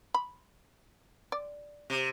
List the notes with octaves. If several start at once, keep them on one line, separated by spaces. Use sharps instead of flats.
B5
D5
C3